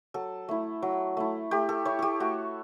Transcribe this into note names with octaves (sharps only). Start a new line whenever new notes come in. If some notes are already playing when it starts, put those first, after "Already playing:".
F#3 A4
A3 E4
F#3
A3 E4
A3 G4
A4
E4 C#5
G4 A4
A3 F#4